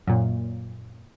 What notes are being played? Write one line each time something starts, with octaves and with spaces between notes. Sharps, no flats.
F#2 A#2